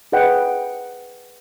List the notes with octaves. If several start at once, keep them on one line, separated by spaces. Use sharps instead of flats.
G#4 B4 D#5 F#5 G5